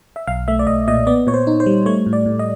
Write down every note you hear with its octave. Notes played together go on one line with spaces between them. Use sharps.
E5
B1 F5
A3 E5
D5
B1 D#5
A#2 D#5
B3 D5
A#2 C#5
C5
D#4
C5
G3
A3 C#5
A2
D5
A2
D#5